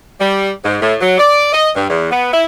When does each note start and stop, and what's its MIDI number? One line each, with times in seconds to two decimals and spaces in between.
0.20 0.51 55
0.64 0.77 44
0.81 0.94 45
1.01 1.16 54
1.18 1.50 74
1.53 1.70 75
1.75 1.88 43
1.90 2.10 40
2.11 2.33 59
2.33 2.44 64